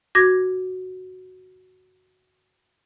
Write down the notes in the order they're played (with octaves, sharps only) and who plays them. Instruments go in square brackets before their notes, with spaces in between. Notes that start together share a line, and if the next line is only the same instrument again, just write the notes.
[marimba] F#4 D6 G#6 A#6